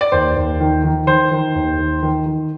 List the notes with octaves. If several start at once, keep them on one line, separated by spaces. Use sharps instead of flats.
D5
D#2 C5
D#2
D#3
D#3
D#3 C5
D#3
D#2
D#3
D#3
D#3